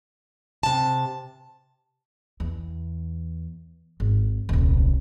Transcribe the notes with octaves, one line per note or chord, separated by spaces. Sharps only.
C3 A5
E2
G#1
D#1 C2